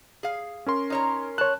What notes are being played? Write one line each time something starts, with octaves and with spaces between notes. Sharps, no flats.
G#4 F5
C#4 A#4 C6
D#4 C#5 A#5
C#5 A5 F#6